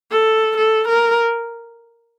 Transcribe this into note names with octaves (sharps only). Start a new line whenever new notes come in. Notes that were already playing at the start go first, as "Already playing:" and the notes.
A4
A4
A#4